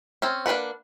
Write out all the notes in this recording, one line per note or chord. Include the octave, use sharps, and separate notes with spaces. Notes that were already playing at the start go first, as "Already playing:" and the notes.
C4 C#4
A#3 D4 F4 B4 F#5